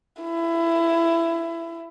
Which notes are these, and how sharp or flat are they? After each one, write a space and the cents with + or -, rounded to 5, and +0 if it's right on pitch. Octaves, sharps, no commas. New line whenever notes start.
E4 +20